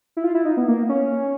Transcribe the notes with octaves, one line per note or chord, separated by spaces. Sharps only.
E4
F4
E4
D#4
B3
A#3
C#4